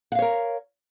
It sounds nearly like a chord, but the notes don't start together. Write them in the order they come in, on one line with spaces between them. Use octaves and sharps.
F#5 F5 C#5 A#4